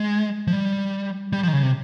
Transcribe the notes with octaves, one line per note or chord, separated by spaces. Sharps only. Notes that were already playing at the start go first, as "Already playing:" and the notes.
Already playing: G#3
F3
G3
G3
F3
D#3
C#3
C3